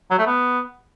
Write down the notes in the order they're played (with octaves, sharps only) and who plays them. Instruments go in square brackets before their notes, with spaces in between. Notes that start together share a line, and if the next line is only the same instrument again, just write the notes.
[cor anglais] F#3
A3
B3